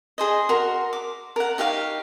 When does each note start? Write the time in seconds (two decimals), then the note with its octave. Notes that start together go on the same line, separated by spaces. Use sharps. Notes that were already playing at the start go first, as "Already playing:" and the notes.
0.18 G#4 C5 D#5
0.49 F#4 A#4 C6
0.93 D6
1.36 A#4 F#5
1.58 D#4 G4 C#5 F5